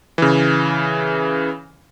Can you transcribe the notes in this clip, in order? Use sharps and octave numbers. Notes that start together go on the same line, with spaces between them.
C#3 E3